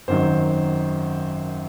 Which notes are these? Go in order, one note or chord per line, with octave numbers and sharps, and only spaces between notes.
G#1 F#2 D#3 F#3 C5